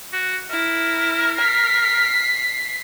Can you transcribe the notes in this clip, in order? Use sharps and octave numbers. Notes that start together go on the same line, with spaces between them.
F#4
E4 A#4
B6 C7